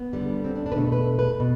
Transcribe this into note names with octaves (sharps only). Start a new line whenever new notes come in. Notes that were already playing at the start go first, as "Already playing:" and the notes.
Already playing: B3
D3 G3
C4
D4
D4
B4
B2 A3 A4
B4
B4
B2